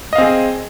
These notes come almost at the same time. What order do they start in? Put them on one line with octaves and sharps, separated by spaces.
D#5 F5 C4 G#4